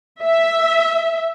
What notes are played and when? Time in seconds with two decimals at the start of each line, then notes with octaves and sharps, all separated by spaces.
0.23 E5